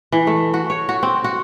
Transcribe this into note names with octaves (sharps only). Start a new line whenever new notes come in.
E3
A3
F#4
C#5
F#4
C4
F#4